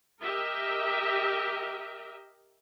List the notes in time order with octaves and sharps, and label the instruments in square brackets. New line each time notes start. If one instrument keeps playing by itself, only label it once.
[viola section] G4 A#4 D#5 E5